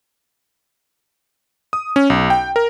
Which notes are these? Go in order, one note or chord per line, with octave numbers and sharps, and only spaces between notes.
D#6
C#4
B1
G5
A#4